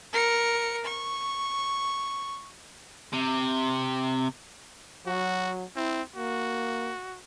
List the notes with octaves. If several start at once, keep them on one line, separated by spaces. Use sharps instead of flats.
A#4 C#7
C#6
C3
F#3 F#4
C4 E4
A#3 F#4